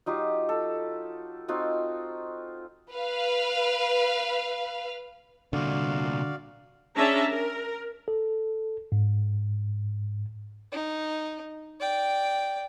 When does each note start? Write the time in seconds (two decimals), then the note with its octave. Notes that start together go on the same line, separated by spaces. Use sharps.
0.06 F#3 D#4 F4 G4
0.49 A4
1.48 C4 D#4 F4 F#4
2.92 B4 F5
5.53 C2 A#2 D3 F#4 D5 F5
6.96 C#4 D4 G#4 E5 A5 A#5
7.29 A#4
8.08 A4
8.92 G#2
10.71 D#4
11.80 D5 G5